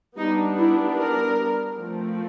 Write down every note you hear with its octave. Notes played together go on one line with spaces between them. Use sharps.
G3 B3 D4 D#4
E4
A#4
F3 A3 C4